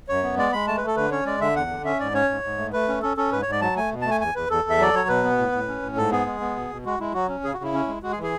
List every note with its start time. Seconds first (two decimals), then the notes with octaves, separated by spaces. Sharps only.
0.08 F#2 C#5
0.23 B3
0.37 G#3 D5
0.52 G#3 B5
0.67 A3 A5
0.77 B4
0.82 A3
0.87 A4
0.96 D3 B4
1.11 C#4 C#5
1.25 G#3 D5
1.41 D3 E5
1.56 E2 F#5
1.70 D3
1.85 C#4 E5
1.99 G#2 D5
2.14 C#4 C#5
2.29 G#2
2.44 G#2
2.58 A3
2.73 A3 B4
2.88 C#4
3.02 C#4 A4
3.17 C#4 A4
3.32 G#2 B4
3.42 C#5
3.47 G#2
3.52 D5
3.61 F#3 A5
3.76 A3 G#5
3.91 B2
4.01 A5
4.05 A3
4.11 G#5
4.21 E2 G#5
4.34 E2 B4
4.49 E2 A4
4.64 E2
4.70 E5
4.78 F#3 D5
4.94 F#3 C#5
5.08 B2 B4
5.24 B3
5.38 A2
5.52 A2
5.68 C#4
5.82 A2
5.96 G#2 A4
6.11 B3 G#4
6.26 G#3
6.40 B3
6.56 B2
6.71 B2
6.85 G#3 F#4
6.99 G#3 E4
7.14 F#3 F#4
7.29 C#4
7.44 C#3 G#4
7.54 F#4
7.59 C#3 E4
7.74 C#4
7.87 G#3
8.03 G#3 F#4
8.12 G#4
8.17 E3
8.23 G#4